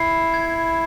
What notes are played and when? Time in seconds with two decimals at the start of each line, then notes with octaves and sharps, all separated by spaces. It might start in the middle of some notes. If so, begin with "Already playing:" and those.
Already playing: E4 B5 C7
0.34 G#6